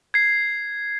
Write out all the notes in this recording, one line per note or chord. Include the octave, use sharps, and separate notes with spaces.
G#6 C7